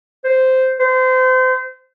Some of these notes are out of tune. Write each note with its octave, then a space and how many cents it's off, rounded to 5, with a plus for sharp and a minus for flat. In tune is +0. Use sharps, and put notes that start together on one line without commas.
C5 -10
C5 -30